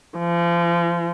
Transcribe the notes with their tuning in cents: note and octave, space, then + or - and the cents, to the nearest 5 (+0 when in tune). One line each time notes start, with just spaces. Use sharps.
F3 -35